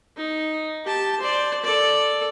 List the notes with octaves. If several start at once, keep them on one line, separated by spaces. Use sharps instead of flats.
D#4
G4 A5
C5 D5
A4 D5